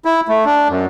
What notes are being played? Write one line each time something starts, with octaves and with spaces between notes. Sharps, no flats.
E4
A3
D4
F#2